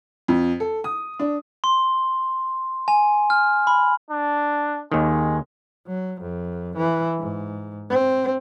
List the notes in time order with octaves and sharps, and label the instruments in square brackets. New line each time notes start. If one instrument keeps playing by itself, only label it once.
[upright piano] F2
A4
D#6
D4
[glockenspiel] C6
G#5
F6
B5
[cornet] D4
[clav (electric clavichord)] D#2 D#3 [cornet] G#3
[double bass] F#3
F2
E3
G#2
C4